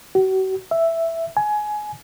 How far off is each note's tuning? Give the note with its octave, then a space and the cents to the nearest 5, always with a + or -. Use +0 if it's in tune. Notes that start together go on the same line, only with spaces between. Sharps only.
F#4 +40
E5 +5
G#5 +20